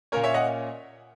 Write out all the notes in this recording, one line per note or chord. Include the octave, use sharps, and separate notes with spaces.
A#2 A#3 C#4 A#4 C#5
C#5 E5
D#5 F#5